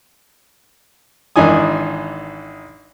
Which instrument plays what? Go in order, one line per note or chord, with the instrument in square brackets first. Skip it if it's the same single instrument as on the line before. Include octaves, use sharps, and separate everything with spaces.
[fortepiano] G#1 E3 D4 D#4 G#5 D#6